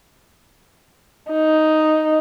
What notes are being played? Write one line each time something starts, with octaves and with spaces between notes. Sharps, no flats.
D#4